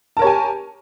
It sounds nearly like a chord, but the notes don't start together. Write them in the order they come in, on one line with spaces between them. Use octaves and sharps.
A5 A#4 C#5 G4 G#5